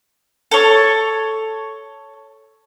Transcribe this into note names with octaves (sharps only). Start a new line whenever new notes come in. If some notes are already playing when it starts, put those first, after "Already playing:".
A4 C#5